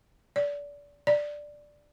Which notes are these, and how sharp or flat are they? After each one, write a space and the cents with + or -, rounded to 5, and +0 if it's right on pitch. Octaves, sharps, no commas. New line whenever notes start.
D5 -25
D5 +5